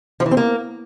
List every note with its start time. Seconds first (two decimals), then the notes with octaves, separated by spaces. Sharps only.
0.20 F3
0.26 E3
0.31 C4
0.37 A#3